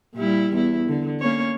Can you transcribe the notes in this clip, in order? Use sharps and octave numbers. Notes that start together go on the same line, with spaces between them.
A#2 G3 E4
E2 E4
D3
A#3 C#4 C#5